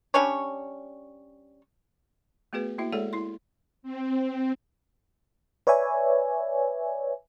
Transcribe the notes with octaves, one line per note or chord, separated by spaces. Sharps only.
G3 C#4 D4 C#5
A3 B3 F#4 G#4 B4
A#3 E4 F#4 E5
G#3 G#4 A4 C#5 D5 F#5
E4 C6
C4
B4 C#5 D5 E5 G#5